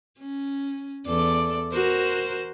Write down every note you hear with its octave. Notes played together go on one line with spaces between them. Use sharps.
C#4
E2 A4 D5
F#4 A#4 C5